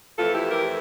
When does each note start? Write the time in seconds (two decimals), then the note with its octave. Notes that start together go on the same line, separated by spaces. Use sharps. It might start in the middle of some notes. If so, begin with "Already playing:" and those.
0.18 F2 E3 A3 F4 A4
0.33 E4 G4
0.50 G4 A#4